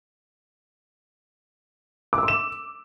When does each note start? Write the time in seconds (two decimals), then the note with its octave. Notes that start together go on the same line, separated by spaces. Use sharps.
2.13 D6
2.18 E6
2.23 C6
2.28 E7